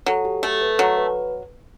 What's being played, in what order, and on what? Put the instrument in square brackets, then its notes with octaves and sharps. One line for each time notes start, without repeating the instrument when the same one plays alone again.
[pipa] F#3 [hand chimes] A4
[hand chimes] G4
[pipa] A3 [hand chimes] A4
[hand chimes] B4
[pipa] F#3 [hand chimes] A4
[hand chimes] B4